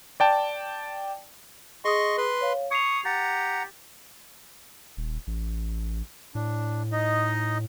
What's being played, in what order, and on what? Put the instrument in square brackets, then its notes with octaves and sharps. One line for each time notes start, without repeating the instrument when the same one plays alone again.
[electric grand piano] D5 G5 A5
[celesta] G#4 D#6 [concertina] D#5 C6 C#6
[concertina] B4 C6
[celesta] C#5 F5
[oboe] C#6 [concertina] D#6 [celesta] G#6 C7 F7
[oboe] G4 [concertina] F#5 A#5 [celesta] A6
[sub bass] D#1
A1
[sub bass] A2 [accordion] D4
[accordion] D#4 D#5